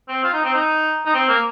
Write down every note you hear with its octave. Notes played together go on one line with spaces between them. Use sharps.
C4
F4
D#4
C4
D#4
D#4
C4
A#3